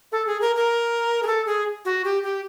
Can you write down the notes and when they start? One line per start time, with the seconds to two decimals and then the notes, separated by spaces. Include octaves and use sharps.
0.12 A4
0.27 G#4
0.41 A#4
0.56 A#4
1.23 G#4
1.27 A4
1.46 G#4
1.85 F#4
2.04 G4
2.23 G4